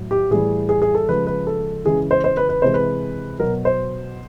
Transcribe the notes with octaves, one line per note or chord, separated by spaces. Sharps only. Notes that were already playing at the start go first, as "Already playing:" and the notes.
Already playing: A2 F#3
G4
A2 E3 G3 G#4
G#4
G#4
A4
C#3 F3 G#3 B4
B4
A4
C#3 E3 G#3 G#4
C5
C5
B4
B4
C3 E3 G#3 C5
B4
B2 F#3 A#4
C5